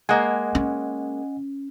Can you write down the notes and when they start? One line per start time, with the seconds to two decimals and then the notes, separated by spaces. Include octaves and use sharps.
0.09 G#3 A#3 D#5 F#5 G#5
0.55 C#4